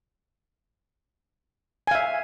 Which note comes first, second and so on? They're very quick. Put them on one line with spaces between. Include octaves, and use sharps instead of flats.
G#5 F5 E5